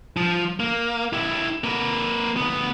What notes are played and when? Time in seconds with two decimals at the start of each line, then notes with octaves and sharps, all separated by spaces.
0.17 F3
0.60 A#3
1.13 E4 G4
1.64 A#3 B4
2.37 D2 B3